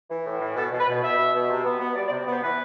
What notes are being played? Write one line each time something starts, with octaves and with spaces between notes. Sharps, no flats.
E3
A2
E3
B2 A4
B2
B4
B2
B2 E5
B2
B2
C3
B3
B3
G3 D5
D5
C3
B3 C5
E3 B4